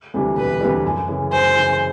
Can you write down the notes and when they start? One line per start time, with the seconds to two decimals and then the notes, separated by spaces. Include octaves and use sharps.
0.14 D2 C3 E3 G3
0.37 E1 B4
0.61 D2 C3 E3 G3
0.84 F#2
1.08 C#3 E3
1.31 F#2 C5
1.55 C#3 E3